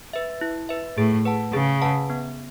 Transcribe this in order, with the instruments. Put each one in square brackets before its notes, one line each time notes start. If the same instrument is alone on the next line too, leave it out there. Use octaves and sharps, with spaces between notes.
[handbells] B4 E5
E4
B4 E5
[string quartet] A2 [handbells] G#4
[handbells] B4 F#5 A5
[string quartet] C#3 [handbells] G#4
[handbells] B4 F#5 A5
B3